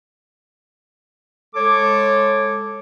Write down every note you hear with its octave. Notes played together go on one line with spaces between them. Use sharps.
G#3 A4 C#5 D6